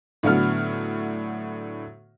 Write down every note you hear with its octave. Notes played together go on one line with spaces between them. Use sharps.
A2 D3 F#3 B3 F6